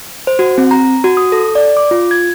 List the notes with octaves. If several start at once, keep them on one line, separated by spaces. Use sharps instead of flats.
C5
F#4
C4
A#5
F#4
D#6
A4
D5
D6
F4
G#6